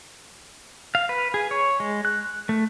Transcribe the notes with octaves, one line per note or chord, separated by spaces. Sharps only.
F5
B4
G#4
C#5
G#3
F#6
A3